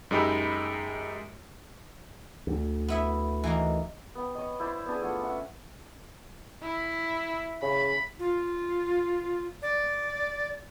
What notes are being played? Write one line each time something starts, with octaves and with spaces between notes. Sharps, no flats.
F#2 G#3 D#4 G4 B5 E6
D2
B3 E4 E5
E3 A#3 D#4
B3 G5
C#5 D#5
E4 C5 D5
B3 D4 G#4
A3 F4 F#5
C#4 E5 F#5
E4
C#3 B5
F4
D5